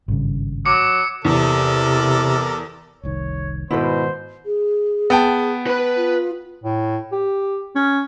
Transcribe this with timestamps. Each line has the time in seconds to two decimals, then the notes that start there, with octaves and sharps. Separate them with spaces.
0.08 G#1 G2 C#3
0.66 F#3 D6 C#7
1.25 E2 C3 A4 A#4 D5
3.03 F1 C2 D#3 C#5
3.71 G#2 B2 D#3 E4 B4 C5
4.46 G#4
5.10 B3 G5 A5
5.67 B4 B5
5.97 F4
6.64 A2
7.12 G4
7.75 C#4